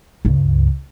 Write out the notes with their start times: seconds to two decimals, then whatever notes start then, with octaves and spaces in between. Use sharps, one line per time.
0.25 C#2 G2